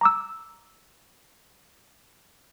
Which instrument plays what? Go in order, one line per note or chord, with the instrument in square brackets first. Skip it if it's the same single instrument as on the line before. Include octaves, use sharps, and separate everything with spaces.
[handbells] A#5 D6 E6